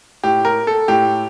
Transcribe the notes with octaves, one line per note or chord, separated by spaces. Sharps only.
A2 G4
A#4
A4
A2 G4